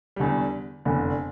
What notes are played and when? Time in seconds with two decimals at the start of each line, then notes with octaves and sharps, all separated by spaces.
0.16 E2 D3 G3
0.85 F1 E2 D3